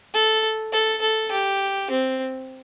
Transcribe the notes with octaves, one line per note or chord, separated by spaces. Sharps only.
A4
A4
A4
G4
C4